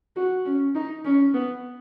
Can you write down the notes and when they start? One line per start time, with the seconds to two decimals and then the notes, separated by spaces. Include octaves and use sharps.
0.16 F#4
0.46 C#4
0.75 D#4
1.05 C#4
1.34 B3